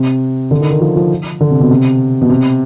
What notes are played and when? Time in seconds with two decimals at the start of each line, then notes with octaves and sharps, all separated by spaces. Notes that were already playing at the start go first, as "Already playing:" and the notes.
Already playing: C3
0.51 D3
0.61 D#3
0.71 D#3
0.80 F3
0.96 F3
1.41 D3
1.50 C3
1.60 B2
1.70 C3
2.22 B2
2.29 C3